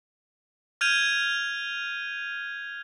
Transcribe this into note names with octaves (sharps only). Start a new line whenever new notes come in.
F6 G6 G#6 D#7 F7